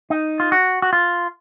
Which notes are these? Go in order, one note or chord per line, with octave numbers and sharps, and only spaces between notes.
D#4
F4
F#4
F#4
F4